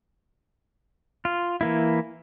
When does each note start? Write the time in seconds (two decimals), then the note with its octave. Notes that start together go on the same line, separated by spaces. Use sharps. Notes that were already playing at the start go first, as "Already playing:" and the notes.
1.25 F4
1.61 E3 A#3 E4